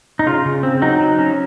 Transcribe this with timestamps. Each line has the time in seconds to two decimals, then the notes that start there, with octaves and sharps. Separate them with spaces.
0.19 D#4
0.26 C#3 F4
0.45 C#3
0.63 C4
0.82 F#3 D#4
1.00 F#3
1.18 C#4